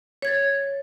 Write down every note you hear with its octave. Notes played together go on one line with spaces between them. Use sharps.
C#5 G#6 A6